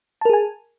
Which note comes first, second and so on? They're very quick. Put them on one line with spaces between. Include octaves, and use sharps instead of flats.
A5 A#4 G#4 G#5